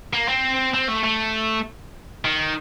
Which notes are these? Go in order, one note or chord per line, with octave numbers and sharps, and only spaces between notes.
A#3
C4
C4
A3
A3
D#3